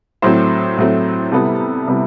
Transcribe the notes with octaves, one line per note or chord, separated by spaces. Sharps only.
A2 F#3 A3 C4 C5
A2 F#3 A3 C4
C3 G3 B3 E4 A4
C3 G3 B3 E4